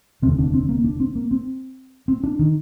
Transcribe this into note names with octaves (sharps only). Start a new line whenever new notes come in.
F1 D#2 D3 C4
D4
C4
A#3
D4
C4
A#3
C4
C4
D4
D#3